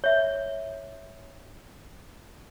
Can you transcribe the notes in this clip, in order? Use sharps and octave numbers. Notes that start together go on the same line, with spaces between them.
C#5 E5